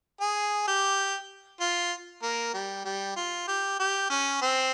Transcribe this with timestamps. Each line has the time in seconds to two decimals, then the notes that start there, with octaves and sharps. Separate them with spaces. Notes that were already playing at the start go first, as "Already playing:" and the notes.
0.21 G#4
0.67 G4
1.60 F4
2.22 A#3
2.54 G3
2.85 G3
3.16 F4
3.48 G4
3.79 G4
4.10 C#4
4.41 C4